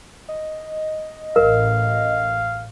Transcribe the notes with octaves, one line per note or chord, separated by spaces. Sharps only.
D#5
A1 A#4 F5